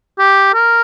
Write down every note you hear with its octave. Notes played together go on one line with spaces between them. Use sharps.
G4
A#4